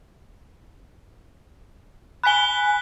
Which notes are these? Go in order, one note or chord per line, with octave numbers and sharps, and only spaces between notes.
G#5 B5 F#6 B6 G7